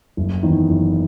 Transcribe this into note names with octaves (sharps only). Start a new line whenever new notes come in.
F#1
E2 D#3
F#1